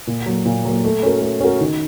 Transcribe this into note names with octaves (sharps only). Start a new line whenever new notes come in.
A#2
F#3 A#3
A#2
F#3 A#3
A3
C#4 F#4 A#4
A3
C#4 F#4 A#4
D#3